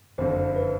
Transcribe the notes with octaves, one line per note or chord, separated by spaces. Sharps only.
F#1 F2 D3 C5
B4